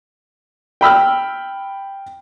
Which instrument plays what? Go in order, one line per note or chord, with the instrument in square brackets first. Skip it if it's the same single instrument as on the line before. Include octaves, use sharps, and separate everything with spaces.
[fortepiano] G5 B5 E6 F6